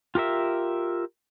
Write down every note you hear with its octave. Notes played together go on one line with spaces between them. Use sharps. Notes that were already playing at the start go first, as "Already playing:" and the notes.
F4 G4 A#4 E5